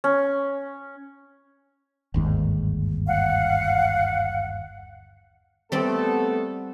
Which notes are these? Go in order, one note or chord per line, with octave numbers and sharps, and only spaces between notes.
C#4
G1 D#2 G#2
F5 F#5
G3 A3 B3 C4 A4 D5